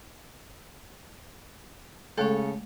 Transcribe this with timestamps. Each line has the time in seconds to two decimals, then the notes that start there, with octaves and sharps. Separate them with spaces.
2.18 C#3 G#3 A3 A4 C#5